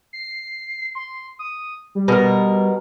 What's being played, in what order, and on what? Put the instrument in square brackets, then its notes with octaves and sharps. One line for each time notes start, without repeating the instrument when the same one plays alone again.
[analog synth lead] C7
C6
D#6
G3
[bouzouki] B2 A#4